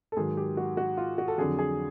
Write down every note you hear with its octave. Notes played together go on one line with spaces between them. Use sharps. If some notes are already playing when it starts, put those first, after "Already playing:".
A4
G#2 D#3 F#3 G#4
G4
F#4
F#4
F4
F#4
A4
F2 D3 F#3 G#4
G#4